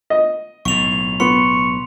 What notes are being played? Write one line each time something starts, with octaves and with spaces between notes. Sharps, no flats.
D#5
B1 A2 C#6 F7
B3 C6 C#6